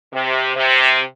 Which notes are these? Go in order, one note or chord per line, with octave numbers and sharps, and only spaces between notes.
C3
C3